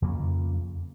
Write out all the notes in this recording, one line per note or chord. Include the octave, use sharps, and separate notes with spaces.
F2 C#3 A#3